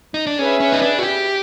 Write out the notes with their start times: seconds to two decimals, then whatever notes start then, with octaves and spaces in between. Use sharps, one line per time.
0.14 D#4
0.27 D4
0.38 C#4 G#4 B4 E5
0.60 C#4
0.72 D#4
0.82 D4
0.99 F#4
1.03 G4